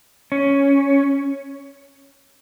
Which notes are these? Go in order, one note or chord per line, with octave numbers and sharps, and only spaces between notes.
C#4